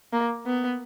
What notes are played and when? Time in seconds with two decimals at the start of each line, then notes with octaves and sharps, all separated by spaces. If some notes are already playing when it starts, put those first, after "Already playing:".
0.13 A#3
0.46 B3